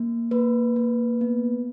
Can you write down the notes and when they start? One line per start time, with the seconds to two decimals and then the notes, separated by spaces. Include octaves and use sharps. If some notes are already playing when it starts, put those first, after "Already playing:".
Already playing: A#3
0.31 A#3 B4
0.76 A#3
1.21 B3